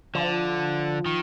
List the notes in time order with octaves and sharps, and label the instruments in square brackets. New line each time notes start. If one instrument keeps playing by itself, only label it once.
[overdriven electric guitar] D3 [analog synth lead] F3
[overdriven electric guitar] D#3